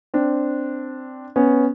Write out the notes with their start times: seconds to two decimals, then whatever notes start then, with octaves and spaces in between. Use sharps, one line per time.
0.14 C4 D4
1.36 B3 C#4